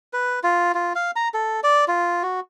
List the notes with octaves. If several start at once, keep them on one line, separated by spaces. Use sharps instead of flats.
B4
F4
F4
F5
A#5
A4
D5
F4
F#4